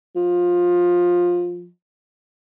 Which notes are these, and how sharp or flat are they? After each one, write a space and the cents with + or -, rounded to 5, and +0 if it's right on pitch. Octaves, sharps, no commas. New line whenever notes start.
F3 +15